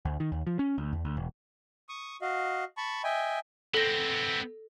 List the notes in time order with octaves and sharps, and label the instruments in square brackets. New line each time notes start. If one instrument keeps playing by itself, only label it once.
[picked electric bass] D2
D#3
D#2
F3
C#4
D2
E2
D2
E1
[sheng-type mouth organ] C#6 D#6
F#4 D#5 F5
A5 B5 C#6
D#5 E5 G5 G#5
[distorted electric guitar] B3 C4 [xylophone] A4 A#6